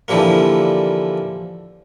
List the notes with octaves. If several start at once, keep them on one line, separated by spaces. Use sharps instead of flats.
D3 E3 F3 G3 A#3